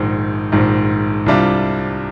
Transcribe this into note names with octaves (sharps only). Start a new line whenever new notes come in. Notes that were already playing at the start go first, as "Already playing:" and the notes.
Already playing: A#1 G#2 D#3
A#1 G#2 D#3
C2 C3 G3 D4 F4